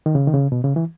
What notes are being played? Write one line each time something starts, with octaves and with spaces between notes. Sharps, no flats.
D#3
C#3
D#3
C#3
B2
C#3
E3